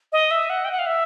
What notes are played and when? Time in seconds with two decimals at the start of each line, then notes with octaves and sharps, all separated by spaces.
0.12 D#5
0.31 E5
0.50 F#5
0.65 G5
0.71 F#5
0.79 F5
0.86 E5